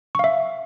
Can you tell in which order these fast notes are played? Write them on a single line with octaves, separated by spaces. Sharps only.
C#6 F5 E5